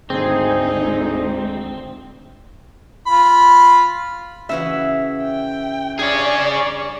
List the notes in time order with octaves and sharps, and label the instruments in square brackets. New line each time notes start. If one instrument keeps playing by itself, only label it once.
[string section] G#1 D2 [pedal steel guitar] C4 [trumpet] D#4 [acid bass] G#4
[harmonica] F4 B5
[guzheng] C#3 E3 F#4 [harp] E5
[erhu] G5
[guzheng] G2 [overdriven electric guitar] G#4 C#5 [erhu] D5